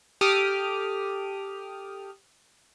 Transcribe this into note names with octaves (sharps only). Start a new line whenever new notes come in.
G4 A4 D6 D#6 F6